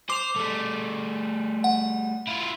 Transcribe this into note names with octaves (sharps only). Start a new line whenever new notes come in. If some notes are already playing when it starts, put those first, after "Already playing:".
C5 D6 F7
G3 A3
F#5
E4 F4